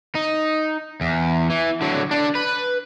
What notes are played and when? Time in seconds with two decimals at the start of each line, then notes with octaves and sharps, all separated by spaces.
0.15 D#4
1.01 E2
1.50 E3
1.81 D3 F#3
2.11 D3 D4
2.35 B4